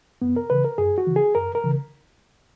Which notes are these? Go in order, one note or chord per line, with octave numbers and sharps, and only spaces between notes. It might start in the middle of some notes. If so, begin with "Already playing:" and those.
F#2 B3
A#4
C#3 E3 B4
A#4
F#2 G#4
F#4
C#3 E3
G#4
F#2 A#4
A#4
C#3 E3